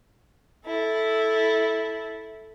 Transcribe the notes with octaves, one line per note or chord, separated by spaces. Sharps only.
E4 A4